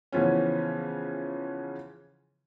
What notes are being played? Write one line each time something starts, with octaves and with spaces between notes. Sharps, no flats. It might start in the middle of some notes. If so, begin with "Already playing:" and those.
C#3 E3 F3 B3 C#4